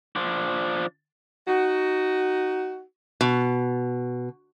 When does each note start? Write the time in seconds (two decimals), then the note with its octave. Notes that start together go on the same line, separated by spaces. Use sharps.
0.16 F3 D4
1.48 D#4 F#4
3.21 B2